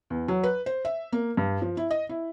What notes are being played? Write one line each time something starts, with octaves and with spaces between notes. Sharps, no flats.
E2
F#3
B4
C5
E5
A#3
G2
F3
E4
D#5
E4